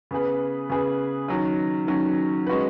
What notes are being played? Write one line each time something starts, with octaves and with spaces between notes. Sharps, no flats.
C#3 B3 G#4 B4
C#3 B3 G#4 B4
D#3 F#3 C#4
D#3 F#3 C#4
G#3 C#4 F#4 B4